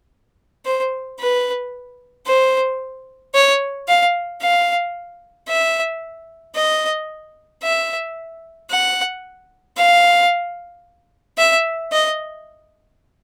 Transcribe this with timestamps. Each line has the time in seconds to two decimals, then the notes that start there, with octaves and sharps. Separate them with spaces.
0.65 C5
1.19 B4
2.26 C5
3.34 C#5
3.88 F5
4.41 F5
5.49 E5
6.55 D#5
7.63 E5
8.70 F#5
9.77 F5
11.38 E5
11.92 D#5